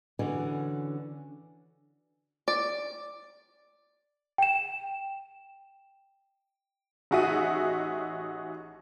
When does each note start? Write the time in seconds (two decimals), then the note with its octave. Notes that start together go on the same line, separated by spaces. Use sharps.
0.19 D3 E3 C#4 F#4
2.48 D5
4.38 G5 E7
7.11 A1 D#4 F#4 G#4 E5 D#7